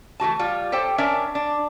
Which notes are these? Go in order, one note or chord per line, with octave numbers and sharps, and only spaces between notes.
E3 A3 F#4 A5
G3 F4
G4 A4 C5 G5
C#4 D4 A#4 D5 E5
D4